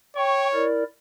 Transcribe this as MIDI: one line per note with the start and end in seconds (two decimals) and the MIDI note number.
0.16 0.67 73
0.16 0.47 79
0.16 0.47 85
0.54 0.83 64
0.54 0.83 70
0.54 0.83 74